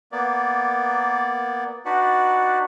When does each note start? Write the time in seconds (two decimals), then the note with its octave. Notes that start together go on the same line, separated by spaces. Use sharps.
0.12 A#3 B3 D5
1.85 D4 D#4 F#4 B4 D5 F#5